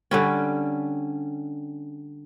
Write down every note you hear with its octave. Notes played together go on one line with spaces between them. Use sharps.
D3 G3 C#4